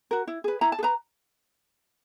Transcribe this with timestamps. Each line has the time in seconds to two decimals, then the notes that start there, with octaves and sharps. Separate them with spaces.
0.11 F#4 A#4
0.27 E4
0.44 G#4 B4
0.61 E4 A#5
0.72 A5
0.79 G#4
0.83 B4 A#5